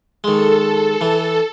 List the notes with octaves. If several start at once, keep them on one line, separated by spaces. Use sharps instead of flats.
D#3 G#3 A4
E3